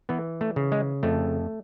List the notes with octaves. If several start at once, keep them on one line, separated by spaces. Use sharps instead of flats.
E3 B3
A3
C#3
G#3
F2 A3